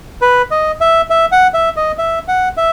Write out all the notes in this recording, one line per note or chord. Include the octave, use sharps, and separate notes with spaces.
B4
D#5
E5
E5
F#5
E5
D#5
E5
F#5
E5